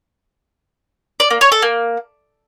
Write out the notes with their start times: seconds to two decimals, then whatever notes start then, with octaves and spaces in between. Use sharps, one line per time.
1.20 D5
1.30 A#3
1.41 C#5
1.52 A4
1.62 A#3